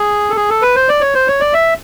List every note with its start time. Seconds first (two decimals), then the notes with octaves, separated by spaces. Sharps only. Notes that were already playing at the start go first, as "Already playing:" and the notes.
Already playing: G#4
0.30 A4
0.36 G#4
0.50 A4
0.62 B4
0.76 C5
0.89 D5
1.01 C#5
1.15 C5
1.28 C#5
1.40 D5
1.53 E5